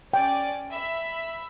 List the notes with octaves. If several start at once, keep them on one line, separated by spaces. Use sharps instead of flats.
C#4 D5 G5
E5 B5